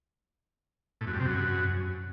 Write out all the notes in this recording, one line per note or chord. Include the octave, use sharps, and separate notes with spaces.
A2
F#2
G2
C3
F#2